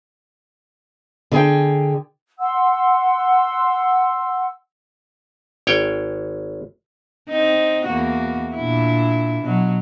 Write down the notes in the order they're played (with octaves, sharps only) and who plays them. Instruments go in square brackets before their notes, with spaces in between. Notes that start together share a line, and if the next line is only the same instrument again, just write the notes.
[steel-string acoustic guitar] D3 G#4 G5
[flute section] F#5 C6 E6
[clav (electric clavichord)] G#1 C#5 G5
[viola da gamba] C4 D#4
E2 A#3 F#4
A#2 D4 E4
B2 F#3